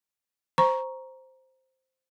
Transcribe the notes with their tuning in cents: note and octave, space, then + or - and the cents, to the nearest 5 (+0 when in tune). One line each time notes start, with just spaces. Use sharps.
C5 +0 A#5 +10 C#6 +0